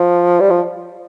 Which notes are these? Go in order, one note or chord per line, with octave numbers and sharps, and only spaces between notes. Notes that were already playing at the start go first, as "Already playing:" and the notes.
Already playing: F3
G3
F3